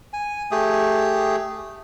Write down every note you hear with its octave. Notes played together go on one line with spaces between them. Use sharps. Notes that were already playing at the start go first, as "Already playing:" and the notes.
G#5
A3 G4 G#4